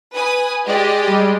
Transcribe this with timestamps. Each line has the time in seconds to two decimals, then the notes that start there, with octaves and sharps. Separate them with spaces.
0.14 B4 G#5 D#6
0.67 G#3 G4 D5 D#5
1.07 G3 G#3